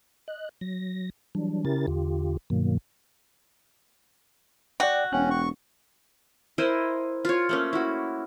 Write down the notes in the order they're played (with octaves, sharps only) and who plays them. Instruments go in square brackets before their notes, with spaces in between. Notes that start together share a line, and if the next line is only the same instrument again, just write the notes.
[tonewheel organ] D#5 F#6
F#3 A#6
E3 F#3 G3 D4
C#3 C#4 E4 G4 A#4 A6
E2 D3 F4 G4
G2 B2 D#3 F#3 A#3
[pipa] F#4 [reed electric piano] D5 G5
[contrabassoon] E1 [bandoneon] C#4 [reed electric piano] F#5 G5 F#6
[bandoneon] C#6
[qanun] E4 A#4 C5 D#5
F4 C#5
A3 A#3 C#4
E4 F#4